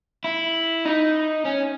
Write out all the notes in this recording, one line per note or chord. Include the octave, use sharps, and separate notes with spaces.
E4
D#4
C#4